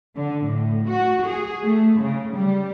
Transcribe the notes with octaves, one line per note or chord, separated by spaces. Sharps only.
D3
A2
F#4
G#4
A3
C#3
G3